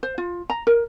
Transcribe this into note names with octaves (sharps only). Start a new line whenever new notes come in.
C5
F4
A#5
A#4